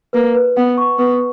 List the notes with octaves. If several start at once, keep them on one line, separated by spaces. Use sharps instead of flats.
A#3 B4
B4
B3 F#5
C#6
B3 B4